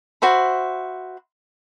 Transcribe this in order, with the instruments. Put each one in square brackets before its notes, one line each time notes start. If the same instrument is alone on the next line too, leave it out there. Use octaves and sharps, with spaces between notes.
[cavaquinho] F#4 C5 E5 B5